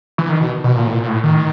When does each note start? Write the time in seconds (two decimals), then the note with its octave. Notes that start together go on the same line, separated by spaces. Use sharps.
0.18 E3
0.29 D#3
0.41 B2
0.64 B2
0.76 A#2
0.87 A2
0.92 A#2
1.03 A#2
1.08 A2
1.24 D#3